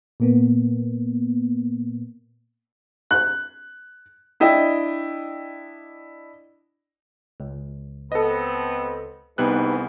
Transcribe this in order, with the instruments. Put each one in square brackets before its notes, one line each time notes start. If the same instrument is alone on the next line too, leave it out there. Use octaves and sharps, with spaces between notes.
[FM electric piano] A#2 A#3 B3
[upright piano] F#6
[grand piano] D4 E4 D#5 G5
[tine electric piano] C#2
[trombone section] B3 C4 B4 [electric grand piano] A4 D#5
[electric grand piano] C2 B3 F#6 [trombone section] G#2 E3 [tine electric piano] D#4 G4 B4